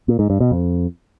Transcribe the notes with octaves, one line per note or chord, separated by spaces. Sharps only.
A#2
G#2
G2
B2
F2